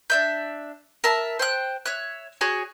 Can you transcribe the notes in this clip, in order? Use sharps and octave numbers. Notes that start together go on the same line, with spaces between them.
D4 E5 G6
A#4 E5 A5
C5 G5 F#6
C#5 E5 F#6
F#4 G#4 C#5 G#5